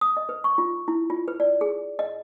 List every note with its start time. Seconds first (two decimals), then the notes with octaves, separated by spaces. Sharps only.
0.01 D#6
0.17 D#5
0.29 B4
0.44 C#6
0.58 F4
0.88 E4
1.10 F4
1.28 B4
1.40 D5
1.61 G#4
1.99 D#5